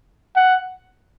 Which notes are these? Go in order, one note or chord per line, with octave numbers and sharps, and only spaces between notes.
F#5